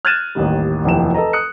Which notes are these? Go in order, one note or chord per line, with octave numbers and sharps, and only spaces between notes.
F6 F#6 G#6 A6 D#7 E7
A1 D#2 D#3 G3
F1 D#2 E3 F3 G5 E7
A4 B4 D#5 A#5
D#6 F#6 C#7